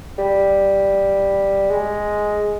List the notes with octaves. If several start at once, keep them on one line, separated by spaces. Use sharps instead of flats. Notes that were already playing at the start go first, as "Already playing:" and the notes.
G3
G#3